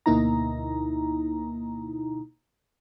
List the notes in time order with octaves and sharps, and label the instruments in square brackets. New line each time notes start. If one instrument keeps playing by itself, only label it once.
[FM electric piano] D2 B2 A#3 D#4 E4 A#5